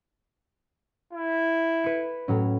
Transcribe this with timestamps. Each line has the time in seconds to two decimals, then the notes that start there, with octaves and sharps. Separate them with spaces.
1.13 E4
1.84 B4 C#7
2.28 A2 F#3 C#4